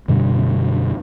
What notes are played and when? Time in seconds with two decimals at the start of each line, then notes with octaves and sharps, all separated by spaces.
0.08 F#2 B2 D3 G3